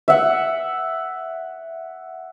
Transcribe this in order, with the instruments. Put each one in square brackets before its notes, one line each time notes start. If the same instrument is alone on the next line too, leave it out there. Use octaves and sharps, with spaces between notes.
[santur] E5 F#5